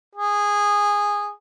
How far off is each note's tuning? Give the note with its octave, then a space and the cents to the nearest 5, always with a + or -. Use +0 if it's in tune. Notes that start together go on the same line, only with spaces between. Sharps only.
G#4 -15